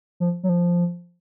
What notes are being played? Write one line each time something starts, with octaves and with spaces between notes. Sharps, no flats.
F3
F#3
F3